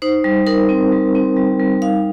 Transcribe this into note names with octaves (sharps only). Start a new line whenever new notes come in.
D#4 C5
G3
D#4 A#4
C4
G3
C4
G3
G3
D#4 F5